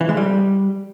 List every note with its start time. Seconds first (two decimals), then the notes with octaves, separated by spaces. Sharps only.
0.01 E3
0.09 G#3
0.17 G3